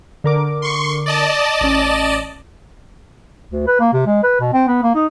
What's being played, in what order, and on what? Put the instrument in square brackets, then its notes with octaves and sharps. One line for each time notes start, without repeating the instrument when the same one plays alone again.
[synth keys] D3 A#4 D6
[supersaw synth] C6 C#6
D5 D#5 A5
[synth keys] A1 C#4
[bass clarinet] D2
B4
A#3
C3
G#3
B4
B2
C4
B3
A#3
D#4